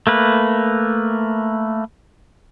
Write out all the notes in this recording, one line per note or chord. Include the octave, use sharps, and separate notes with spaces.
A3 A#3 B4